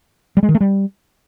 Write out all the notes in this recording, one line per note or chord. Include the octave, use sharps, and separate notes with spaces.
G3
G#3
D#3
A3
G3